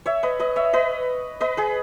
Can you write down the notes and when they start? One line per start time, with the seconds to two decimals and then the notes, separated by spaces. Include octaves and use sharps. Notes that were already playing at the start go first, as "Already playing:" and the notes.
0.06 C#5 E5
0.23 B4 D#5
0.40 B4 D#5
0.56 C#5 E5
0.73 B4 D#5
1.41 B4 D#5
1.57 G#4 B4